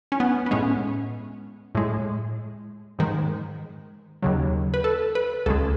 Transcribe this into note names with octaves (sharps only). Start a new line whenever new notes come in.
C#4
B3
B3
A2 G#3 C#4
A2 G#3
G#2 D#3 G#3
D#2 C#3 F#3
B4
A4
B4
C#2 C#3 G#3 A4